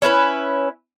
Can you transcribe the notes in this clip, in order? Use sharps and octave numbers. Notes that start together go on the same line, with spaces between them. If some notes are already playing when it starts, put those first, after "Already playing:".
C#4 E4 A#4 B4